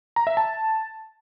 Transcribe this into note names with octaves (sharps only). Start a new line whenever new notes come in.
A#5
E5
A5